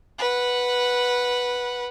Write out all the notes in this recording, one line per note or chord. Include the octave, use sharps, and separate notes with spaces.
B4 F#5